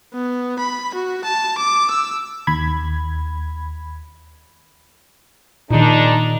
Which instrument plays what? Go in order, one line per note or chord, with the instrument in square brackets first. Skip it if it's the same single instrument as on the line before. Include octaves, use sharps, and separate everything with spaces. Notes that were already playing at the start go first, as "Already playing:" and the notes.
[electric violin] B3
B5
F#4
A5
D6
E6
[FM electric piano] D#2 B5 G#6
[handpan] A#2 D#3 [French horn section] G#3 D4 D#4